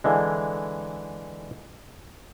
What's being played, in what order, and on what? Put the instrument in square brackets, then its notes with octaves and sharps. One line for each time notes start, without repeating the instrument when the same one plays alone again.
[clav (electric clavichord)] D3 E3 G#3